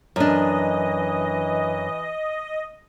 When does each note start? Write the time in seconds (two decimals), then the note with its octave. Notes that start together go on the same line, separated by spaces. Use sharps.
0.16 F#2 E3 D4 D#5